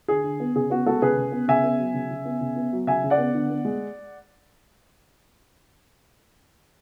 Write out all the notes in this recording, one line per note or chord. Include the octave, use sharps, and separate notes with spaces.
D3 G#4
D3
B3
C#3 G#4
B3 F#4
G#3 F#4 A4
C#3 G#4 B4
C#3
B3
C#3 E5 G#5
B3
F#3
C#3
C#3
B3
C#3
B3
F#3
C#3 E5 G#5
C#3
D5 F#5
B3
D3
B3
G#3